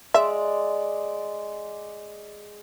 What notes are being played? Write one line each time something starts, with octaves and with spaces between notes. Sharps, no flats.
G#3 D5 E5